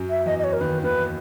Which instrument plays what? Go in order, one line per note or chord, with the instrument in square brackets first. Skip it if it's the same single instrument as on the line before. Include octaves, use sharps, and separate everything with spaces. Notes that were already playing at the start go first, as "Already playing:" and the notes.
Already playing: [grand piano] F#2 F#3
[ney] E5
[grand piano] E2 E3 [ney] D#5
[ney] D#5
C#5
A#4
[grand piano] D#2 D#3 [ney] B4
[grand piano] D#2 D#3 [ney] B4